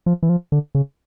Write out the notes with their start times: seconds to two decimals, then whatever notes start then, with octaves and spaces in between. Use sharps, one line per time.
0.06 F3
0.23 E3
0.29 F3
0.52 D3
0.75 C#3